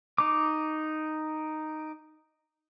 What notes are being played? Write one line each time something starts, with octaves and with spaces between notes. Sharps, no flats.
D#4 D6